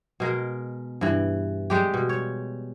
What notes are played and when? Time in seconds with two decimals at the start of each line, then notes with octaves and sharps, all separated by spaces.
0.20 B2 G#3 A#4
1.01 G2 E3
1.70 G3 G#3 G4
1.94 B2
2.09 C#5